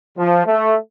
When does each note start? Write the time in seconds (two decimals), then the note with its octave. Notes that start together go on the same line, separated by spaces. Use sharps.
0.18 F3
0.46 A3